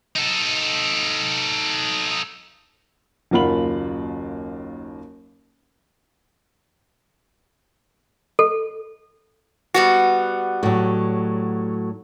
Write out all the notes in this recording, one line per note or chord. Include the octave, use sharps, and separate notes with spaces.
D#4 A4
F#1 D#2 F4 F#5 B5 F#7
A4
G3 B3 F#4
A2 F#3